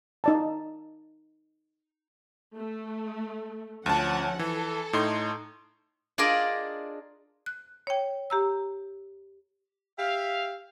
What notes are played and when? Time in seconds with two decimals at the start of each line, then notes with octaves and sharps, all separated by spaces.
0.24 D#4 D5 A5
2.58 A3
3.86 D2 F3 C#4 F#5 A5
4.39 E3 A4
4.93 A2 D#4 C6
6.18 D4 F4 G#4 A#4 D5 D#5
7.46 F#6
7.87 C#5 G5
8.30 G4 A#5 E6
9.99 G4 E5 F5